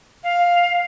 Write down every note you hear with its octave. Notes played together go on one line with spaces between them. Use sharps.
F5